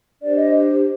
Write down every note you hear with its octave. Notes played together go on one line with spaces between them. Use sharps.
D4 G4 C5 D5
D#5